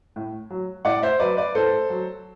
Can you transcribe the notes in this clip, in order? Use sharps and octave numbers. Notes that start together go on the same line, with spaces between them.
A2
F#3
A2 D5 F#5
C5 E5
F#3 B4 D5
B4 D5
A2 A4 C5
F#3